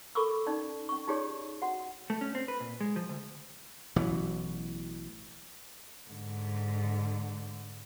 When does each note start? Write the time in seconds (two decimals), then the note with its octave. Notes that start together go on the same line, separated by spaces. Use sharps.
0.15 A4 A#4 B5 C#6 D6 E6
0.46 C#4 D#4 D5
0.89 C#4 C#6
1.07 D#4 F4 G4 G#4 C#5 D5
1.62 F#4 F#5
2.10 A3
2.21 C#4
2.35 C4
2.48 B4
2.60 A#2
2.81 G#3
2.96 F3
3.09 D2
3.96 A1 B2 E3 F#3
6.08 G#2 D3